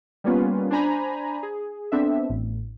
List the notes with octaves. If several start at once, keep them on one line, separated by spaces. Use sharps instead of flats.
G3 A#3 B3 C#4 F4 B4
D4 C5 G#5 A#5 B5
G#4
B3 C4 D4 A4 E5
A1 A2